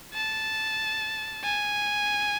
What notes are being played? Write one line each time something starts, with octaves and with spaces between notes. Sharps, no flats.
A5
G#5